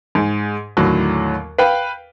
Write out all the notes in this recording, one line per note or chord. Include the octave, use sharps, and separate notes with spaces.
G#2
D#2 A2 D3 F#3
B4 F5 G5